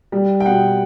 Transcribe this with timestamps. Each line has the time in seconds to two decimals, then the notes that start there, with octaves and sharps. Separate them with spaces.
0.12 G3
0.40 G5
0.46 B2 F#5